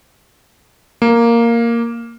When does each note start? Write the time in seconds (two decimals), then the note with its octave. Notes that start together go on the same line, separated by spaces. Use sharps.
1.02 A#3